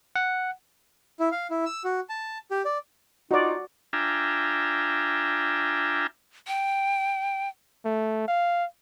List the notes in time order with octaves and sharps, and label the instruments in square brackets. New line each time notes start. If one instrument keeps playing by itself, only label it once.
[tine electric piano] F#5
[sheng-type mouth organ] E4
F5
E4
E6
F#4
A5
G4
D5
[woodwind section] D#4 F4 [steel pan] F#4 D5
[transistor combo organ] D4 F4 E5 G5 G#5 A#5
[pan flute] G5
[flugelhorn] A3
F5